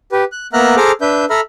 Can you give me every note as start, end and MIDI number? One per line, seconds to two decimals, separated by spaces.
0.12 0.24 67
0.12 0.24 71
0.32 0.47 90
0.53 0.76 58
0.53 0.76 59
0.53 0.76 76
0.53 0.76 82
0.53 0.76 89
0.53 0.76 90
0.77 0.92 68
0.77 0.92 69
0.77 0.92 72
0.77 0.92 82
0.77 0.92 86
0.77 0.92 89
1.01 1.25 62
1.01 1.25 71
1.01 1.25 76
1.01 1.25 91
1.30 1.40 69
1.30 1.40 76
1.30 1.40 82
1.30 1.40 83
1.30 1.40 89